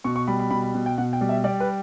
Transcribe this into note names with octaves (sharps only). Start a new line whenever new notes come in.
B2 C#6
C#6
G3 B5
B5
B2 B5
B5
B2
G5
B2 F#5
G5
G3
E5
G3 D5
B4